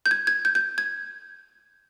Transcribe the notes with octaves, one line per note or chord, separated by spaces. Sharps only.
G6
G#6
G#6
G6
G6
G#6